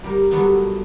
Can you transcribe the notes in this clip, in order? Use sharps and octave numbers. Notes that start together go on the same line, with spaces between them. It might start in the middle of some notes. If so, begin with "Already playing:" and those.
G3 G4 A#4
F#3 G3 A3 B3 D4